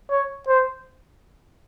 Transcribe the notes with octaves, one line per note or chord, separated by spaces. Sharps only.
C#5
C5